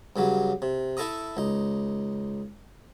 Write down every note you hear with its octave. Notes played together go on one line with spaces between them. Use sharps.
G2 C#3 F#3
C3
E4 A4 E5 A#5 D#6
C#2 D#4